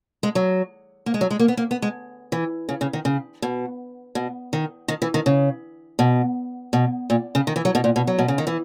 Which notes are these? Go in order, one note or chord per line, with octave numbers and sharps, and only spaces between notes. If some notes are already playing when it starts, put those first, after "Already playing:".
G#3
F#3
A#3
G#3
F#3
G#3
A#3
B3
A#3
B3
G#3
E3
C#3
C#3
D#3
C#3
B2
B2
D#3
D#3
E3
D#3
C#3
B2
B2
A#2
C#3
D#3
E3
F#3
B2
A#2
B2
F#3
B2
C#3
D#3
E3